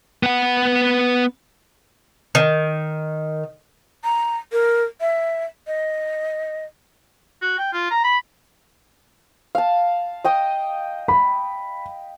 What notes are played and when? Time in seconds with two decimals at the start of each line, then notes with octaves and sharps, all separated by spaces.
0.23 B3 F#5
2.35 D#3
4.04 A#5
4.52 A#4
5.01 E5
5.67 D#5
7.42 F#4
7.58 G5
7.73 F4
7.91 A#5
8.04 B5
9.55 F5 A5
10.24 D#5 G5 D#6
11.08 B5